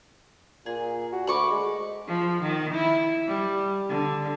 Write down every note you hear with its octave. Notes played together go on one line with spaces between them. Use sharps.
A#2 G#4
F#4
D2 B5 C#6 D6
G#3
F3
D#3
E4
G3
D3